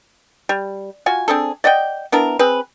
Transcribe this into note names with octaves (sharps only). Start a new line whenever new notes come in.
G3
F4 F#4 G#5
C4 D4 G#4 A4
D5 D#5 F#5 G5
B3 D4 E4 A#4
C4 G#4 B4